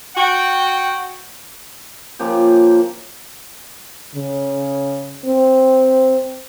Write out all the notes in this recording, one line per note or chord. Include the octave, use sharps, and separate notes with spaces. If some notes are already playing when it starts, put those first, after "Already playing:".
F#4 F#5 G5
C#3 F3 A#3 G4
C#3
C4